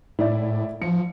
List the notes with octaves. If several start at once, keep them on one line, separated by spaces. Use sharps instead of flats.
A2 E4 D5
F3 C#7